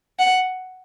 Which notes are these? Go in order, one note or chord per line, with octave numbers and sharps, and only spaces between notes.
F#5